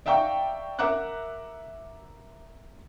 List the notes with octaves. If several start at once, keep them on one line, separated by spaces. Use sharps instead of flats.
D5 E5 F5 G5 A#5 C#6
A#4 E5 F#5 A#5 D6 F#6